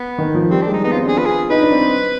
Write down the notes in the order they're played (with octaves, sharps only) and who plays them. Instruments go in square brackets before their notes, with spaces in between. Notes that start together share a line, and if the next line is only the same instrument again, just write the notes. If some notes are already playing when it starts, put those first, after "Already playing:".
Already playing: [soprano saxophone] B3
[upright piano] D#3
F3
[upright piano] G3 [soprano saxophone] C4
[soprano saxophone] D4
[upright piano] G#3
[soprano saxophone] D#4
[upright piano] B3 [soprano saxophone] D#4
[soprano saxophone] F4
[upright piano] C4
D4
[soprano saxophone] G#4
[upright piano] F4 [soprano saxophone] B4
[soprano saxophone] G#4
[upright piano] D#4 [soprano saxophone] B4
[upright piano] D4
C4